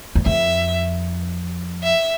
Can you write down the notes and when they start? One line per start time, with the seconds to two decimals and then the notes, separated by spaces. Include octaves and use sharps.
0.15 E2
0.26 F2 E5
1.84 E5